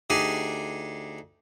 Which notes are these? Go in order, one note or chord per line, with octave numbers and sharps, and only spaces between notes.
D2 D4 D#4 G4 G#4 G#5